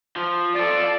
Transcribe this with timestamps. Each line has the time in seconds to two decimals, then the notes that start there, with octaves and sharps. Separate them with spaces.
0.16 F3
0.56 F4 A4 D5